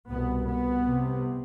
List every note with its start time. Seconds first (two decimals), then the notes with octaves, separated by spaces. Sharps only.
0.10 C2 B2 B3
0.47 B3
0.82 C2 C3